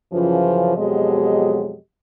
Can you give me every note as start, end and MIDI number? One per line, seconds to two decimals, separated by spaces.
0.13 0.74 42
0.13 0.74 49
0.13 0.74 52
0.13 0.74 53
0.77 1.76 41
0.77 1.76 47
0.77 1.76 54
0.77 1.76 56
0.77 1.76 67
0.77 1.76 75